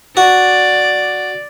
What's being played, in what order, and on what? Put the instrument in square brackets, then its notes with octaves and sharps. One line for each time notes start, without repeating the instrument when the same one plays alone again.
[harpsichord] F#4 [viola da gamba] D5